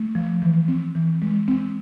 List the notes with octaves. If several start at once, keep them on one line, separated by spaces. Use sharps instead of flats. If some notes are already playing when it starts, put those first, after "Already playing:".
Already playing: A3
F3
E3
C4
E3
G#3
C4